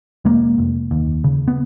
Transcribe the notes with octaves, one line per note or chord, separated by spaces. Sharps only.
F1 G#3 A#3
F1
D#2
C#3
B3